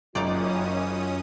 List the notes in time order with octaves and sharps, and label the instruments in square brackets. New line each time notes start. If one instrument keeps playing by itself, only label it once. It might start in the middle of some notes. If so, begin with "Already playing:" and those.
[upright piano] F#1 [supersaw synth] F#2 C#4 D#6 [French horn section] D#3 F4 [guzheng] D#4 D5